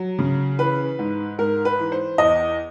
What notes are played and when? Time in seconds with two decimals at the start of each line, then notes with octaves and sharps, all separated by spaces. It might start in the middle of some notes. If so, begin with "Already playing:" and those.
Already playing: F#3
0.19 C#3
0.59 E3 B4
0.99 G#2
1.38 G#2 A#4
1.65 B4
1.79 E3
1.92 C5
2.18 E2 D#5